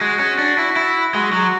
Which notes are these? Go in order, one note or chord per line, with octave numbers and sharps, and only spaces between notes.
G#3 F#4
C#4
D4
E4
E4
G#3 F#4
F#3